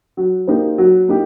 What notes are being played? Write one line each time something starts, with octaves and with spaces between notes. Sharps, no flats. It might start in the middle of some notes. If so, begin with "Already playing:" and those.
F#3
A#3 D#4 G4 C5
F#3
A#3 D#4 G4